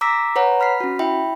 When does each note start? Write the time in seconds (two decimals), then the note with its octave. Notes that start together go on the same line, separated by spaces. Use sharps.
0.01 A#5 D6 E6 A#6 B6
0.36 B4 C#5 F#5 A#5
0.60 B5 F6 B6 C7
0.80 C#4 F#4
0.99 E4 E5 G5 B5